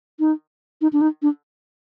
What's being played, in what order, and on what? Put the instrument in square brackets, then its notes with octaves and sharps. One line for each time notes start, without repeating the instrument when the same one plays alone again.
[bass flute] D#4
D#4
D4
D#4
D4